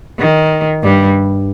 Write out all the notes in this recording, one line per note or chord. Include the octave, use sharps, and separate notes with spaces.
D#3
G2 G3